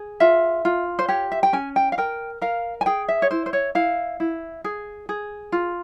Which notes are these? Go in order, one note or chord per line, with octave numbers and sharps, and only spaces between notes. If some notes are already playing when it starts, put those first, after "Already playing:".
Already playing: G#4
F4 E5
F4
C5
G4 C#5
E5
G5
C#4 G#5
G5
F5
A#4 G5
A#4 F5
G#5
G#4 G5
E5
C#5
E4 C5
C5
C#5
E4 F5
E4
G#4
G#4
F4